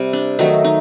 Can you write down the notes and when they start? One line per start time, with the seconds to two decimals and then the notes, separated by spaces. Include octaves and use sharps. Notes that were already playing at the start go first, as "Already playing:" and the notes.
Already playing: C3 G3
0.13 D4
0.39 D#3 F#3 A3 D#4
0.64 D#4